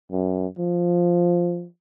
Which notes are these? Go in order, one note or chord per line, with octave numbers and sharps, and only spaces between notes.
F#2
F3